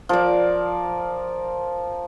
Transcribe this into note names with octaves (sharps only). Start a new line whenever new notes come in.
F3 A#4 D5